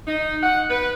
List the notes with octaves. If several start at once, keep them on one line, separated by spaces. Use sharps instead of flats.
D#4
F#5
B4